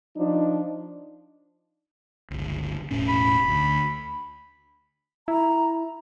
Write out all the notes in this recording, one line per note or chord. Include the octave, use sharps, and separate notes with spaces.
F3 D4 D#4
G1 C#2
E1 A2 C#4
B5
D2
E4 A#5